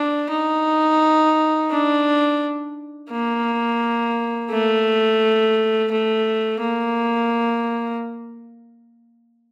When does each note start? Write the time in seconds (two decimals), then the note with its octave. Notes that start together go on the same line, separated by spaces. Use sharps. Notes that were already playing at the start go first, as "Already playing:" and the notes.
Already playing: D4
0.31 D#4
1.71 D4
3.11 A#3
4.50 A3
5.91 A3
6.60 A#3